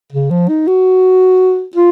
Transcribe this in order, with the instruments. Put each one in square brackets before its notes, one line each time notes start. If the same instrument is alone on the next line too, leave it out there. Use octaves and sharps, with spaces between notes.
[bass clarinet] C#3
F3
D#4
F#4
F4